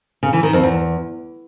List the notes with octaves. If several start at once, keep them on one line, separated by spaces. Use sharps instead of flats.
C#3
E3
D#3
F2
E2